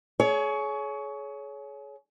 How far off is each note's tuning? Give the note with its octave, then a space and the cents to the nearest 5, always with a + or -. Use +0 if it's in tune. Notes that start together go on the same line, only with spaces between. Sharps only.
G#4 +35 C#5 +15